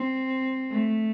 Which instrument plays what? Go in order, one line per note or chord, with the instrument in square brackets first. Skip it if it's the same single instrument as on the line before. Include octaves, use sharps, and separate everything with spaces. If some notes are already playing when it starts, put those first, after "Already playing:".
Already playing: [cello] C4
A3